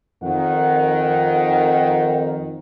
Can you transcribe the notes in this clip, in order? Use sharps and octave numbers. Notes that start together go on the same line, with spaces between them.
F2 D#3 F#5